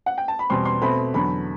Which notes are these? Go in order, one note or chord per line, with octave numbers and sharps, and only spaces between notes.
F#5
G5
A5
B5
E2 B2 G3 C4 C6
C6
B2 A3 C4 B5
E2 D3 F#3 B5